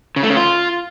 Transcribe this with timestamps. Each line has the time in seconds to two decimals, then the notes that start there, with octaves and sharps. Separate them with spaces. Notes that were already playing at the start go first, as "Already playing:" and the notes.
0.16 C#3
0.23 A3
0.30 C#3
0.37 F4